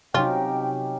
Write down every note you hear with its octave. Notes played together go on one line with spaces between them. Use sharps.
C3 F#3 C#4 D#4 F4 G4 G5